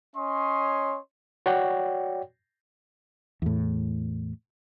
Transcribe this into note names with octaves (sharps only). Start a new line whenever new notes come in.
C#4 C#5 D#5 C6
F#4 C#5 D5 F#5 G5
E2 A2